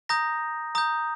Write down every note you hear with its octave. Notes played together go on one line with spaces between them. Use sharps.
A#5 D#6 G6 A#6
A#5 D#6 G6